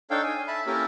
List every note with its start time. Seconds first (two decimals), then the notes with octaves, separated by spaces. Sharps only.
0.11 D4 D#4 A4 C#5 F5 G5
0.24 G#5
0.48 E5 A5 B5
0.66 A#3 C#4 E4 G4 A4 A#4